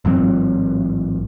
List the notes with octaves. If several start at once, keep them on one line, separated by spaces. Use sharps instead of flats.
A1 G#2 F#3 C4